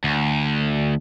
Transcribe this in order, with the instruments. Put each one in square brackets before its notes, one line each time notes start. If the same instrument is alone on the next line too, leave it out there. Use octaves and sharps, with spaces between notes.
[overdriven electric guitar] D2